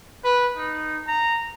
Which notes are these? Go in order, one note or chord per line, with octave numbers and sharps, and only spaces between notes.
B4
D#4
A#5